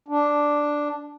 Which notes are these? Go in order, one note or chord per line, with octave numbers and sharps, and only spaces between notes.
D4